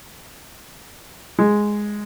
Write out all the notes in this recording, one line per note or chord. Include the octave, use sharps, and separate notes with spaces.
G#3